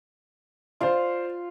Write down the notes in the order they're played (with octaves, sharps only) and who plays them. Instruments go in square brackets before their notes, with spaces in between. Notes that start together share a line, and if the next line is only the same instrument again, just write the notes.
[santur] F4 F5 [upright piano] C5 D5